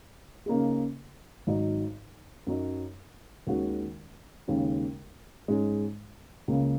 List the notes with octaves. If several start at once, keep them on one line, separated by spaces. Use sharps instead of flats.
C#3 A#3 D#4 G#4
G#1 G#2 F#3 D#4 F#4
F#2 F#3 D#4
D#2 D#3 G#3 C#4 F#4
D#2 C#3 G#3
G#2 G#3 C#4 G#4
C#2 C#3 A#3